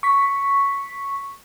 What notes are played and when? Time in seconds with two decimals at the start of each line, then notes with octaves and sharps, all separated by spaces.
0.03 C#6 B6